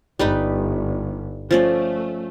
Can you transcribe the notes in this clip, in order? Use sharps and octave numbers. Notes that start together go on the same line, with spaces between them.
G1 G3 D#4 B4
F3 A3 C#4 D5